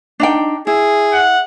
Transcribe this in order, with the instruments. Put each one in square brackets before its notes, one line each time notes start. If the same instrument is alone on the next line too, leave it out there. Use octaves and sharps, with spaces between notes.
[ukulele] D4 D#4 G5
[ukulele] E4 [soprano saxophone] G#4
[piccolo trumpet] F#5